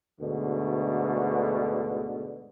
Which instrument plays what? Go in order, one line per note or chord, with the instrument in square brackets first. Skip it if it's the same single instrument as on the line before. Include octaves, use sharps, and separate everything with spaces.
[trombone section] D2 G#2 B2 D3